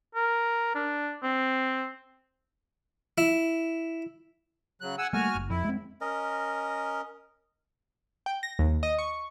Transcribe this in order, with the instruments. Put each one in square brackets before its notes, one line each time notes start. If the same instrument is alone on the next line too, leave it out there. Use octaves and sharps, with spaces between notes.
[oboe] A#4
D4
C4
[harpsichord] E4
[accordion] C#3 F#3 F#6
F#5 G#5 E6
[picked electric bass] G3 A3 A#3 [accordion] F#4 G#5 F6
[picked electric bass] F#1
[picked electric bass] F2 [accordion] E4
[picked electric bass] G#3 C4
[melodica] C#4 A#4 D#5
[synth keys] G5
A#6
D#2
D#5
C#6